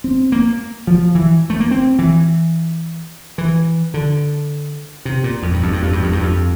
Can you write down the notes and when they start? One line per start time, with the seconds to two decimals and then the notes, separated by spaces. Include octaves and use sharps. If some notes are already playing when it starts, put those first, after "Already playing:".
0.04 C4
0.32 A#3
0.87 F3
1.15 E3
1.50 A3
1.60 A#3
1.71 C4
1.99 E3
3.38 E3
3.94 D3
5.05 C3
5.24 A#2
5.42 F2
5.53 G2
5.63 F2
5.73 G2
5.83 F2
5.93 G2
6.03 F2
6.13 G2
6.23 F2